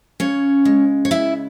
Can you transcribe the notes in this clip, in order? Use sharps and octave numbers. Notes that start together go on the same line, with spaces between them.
C#3 C#4 C#5
G#3
C#5
C#3 E4 E5